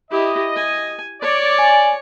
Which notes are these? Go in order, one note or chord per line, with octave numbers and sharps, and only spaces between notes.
E4 G4 D#5
G#5
C#5 D5
G#5